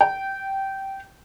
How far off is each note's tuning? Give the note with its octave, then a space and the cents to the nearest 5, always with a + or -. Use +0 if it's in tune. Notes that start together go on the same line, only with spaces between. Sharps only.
G5 -15